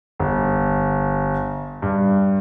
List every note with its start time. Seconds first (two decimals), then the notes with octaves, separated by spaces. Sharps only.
0.19 G1
1.82 G2